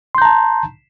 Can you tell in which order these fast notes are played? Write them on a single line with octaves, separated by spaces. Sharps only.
C6 G6 A#5 A5